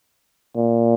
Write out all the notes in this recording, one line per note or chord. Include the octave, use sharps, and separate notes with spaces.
A#2